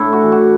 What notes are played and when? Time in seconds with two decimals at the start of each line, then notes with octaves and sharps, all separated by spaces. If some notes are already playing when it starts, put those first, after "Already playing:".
Already playing: A2 D4 E4
0.13 F#4
0.22 E3
0.32 F#4